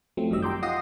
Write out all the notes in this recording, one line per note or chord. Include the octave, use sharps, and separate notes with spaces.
F3 F#3 A3 C4
G#1 F#2 D#3 G3 D#5 E6
G5 A#5 C6 D6 G6
F4 D#5 F#5 D#6 A#6 C7